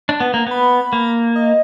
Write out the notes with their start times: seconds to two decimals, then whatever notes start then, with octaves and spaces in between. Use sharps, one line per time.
0.09 D4
0.20 B3
0.34 A#3
0.47 B3 B5
0.93 A#3
1.35 D#5